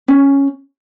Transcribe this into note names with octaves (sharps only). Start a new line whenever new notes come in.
C#4